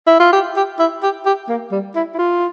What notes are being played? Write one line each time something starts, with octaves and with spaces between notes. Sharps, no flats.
E4
F4
G4
G4
E4
G4
G4
A#3
G3
E4
E4
F4